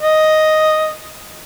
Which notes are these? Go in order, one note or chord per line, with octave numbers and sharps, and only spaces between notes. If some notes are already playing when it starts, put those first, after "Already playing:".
D#5